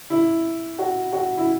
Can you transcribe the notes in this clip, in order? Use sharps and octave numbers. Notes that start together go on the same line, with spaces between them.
E4
F#4
F#4
E4